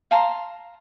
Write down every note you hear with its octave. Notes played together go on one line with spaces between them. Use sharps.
F5 A5 A#5 C6